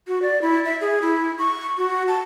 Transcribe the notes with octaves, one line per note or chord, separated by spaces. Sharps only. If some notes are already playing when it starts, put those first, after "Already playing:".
F#4
D5
E4
E5
G#4
E4
C#6
F#4
A5